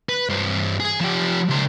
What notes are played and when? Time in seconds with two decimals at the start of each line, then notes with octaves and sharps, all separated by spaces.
0.09 B4
0.29 G2 C4
0.80 G#4
1.00 F3 G4
1.49 C#2 C5